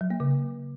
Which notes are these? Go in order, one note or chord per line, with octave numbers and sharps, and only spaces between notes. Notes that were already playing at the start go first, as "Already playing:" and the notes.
F#3
A#3
C#3